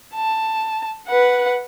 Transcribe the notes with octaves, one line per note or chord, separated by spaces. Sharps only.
A5
B4 F#5